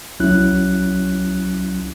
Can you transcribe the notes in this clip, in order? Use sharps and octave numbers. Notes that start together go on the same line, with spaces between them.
C2 F#3 C#4 E4 F#6